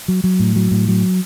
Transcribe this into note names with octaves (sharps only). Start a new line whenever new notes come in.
F#3
F#3
A2
F#3
A2
F#3